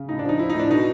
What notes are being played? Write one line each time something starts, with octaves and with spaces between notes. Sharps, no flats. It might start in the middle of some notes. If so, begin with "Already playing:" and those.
Already playing: C#3
A2 D#4
D4
F3 D#4
F3 E4
A2 D#4
D4
B2 D#4